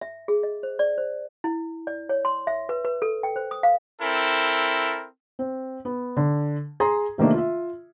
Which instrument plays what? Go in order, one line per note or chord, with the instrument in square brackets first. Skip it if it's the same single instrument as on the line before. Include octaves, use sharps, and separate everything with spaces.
[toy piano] E5
G#4
D#5
C5
D5
C5
E4
D5
C#5
C6
E5
B4
B4
A4
G5
C5
D#6
F5
[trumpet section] C4 E4 A4 A#4
[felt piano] C4
B3
D3
G#4 A#5 C6
C3 D#3 A3 A#3 D4
F4 E5